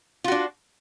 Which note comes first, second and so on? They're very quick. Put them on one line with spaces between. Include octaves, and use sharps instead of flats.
F4 F#4 D4